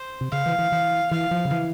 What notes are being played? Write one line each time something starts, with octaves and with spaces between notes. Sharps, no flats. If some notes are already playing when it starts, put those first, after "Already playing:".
Already playing: C5
C3
C#3 F5
E3
E3
E3
E3 F5
F3
C#3
E3